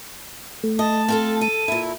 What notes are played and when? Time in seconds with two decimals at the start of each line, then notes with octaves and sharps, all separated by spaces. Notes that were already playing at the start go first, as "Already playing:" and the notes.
0.64 A3
0.79 D#5 A5
1.08 C4 F4 A4
1.41 A4 D#7
1.68 A#2 E4